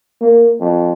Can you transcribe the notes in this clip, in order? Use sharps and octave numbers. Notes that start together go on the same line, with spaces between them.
A#3
F2